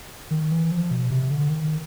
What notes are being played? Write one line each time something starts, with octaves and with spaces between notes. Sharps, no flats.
D#3
E3
F3
B2
C3
D3
D#3